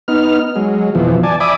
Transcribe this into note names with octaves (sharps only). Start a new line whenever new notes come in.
B3 D#4 F6
F#3 G#3
F2 B2 E3 F3
D5 G#5 A5
D5 E5 G#5 B5 D6 D#6